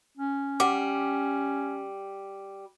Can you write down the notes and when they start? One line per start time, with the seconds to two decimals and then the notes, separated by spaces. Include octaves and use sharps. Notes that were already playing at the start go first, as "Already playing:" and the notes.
0.17 C#4
0.60 G3 F#5 D6